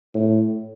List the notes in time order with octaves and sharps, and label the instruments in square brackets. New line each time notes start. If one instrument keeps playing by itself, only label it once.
[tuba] A2